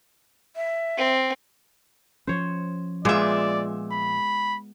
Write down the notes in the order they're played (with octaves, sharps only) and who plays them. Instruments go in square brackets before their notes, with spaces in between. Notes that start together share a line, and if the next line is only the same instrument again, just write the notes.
[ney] E5
[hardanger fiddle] C4
[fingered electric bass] F3 C#4 [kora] C5 C#5
[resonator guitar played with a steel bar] A#2 E5 [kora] G#3 B3 F4 [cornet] D5
[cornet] B5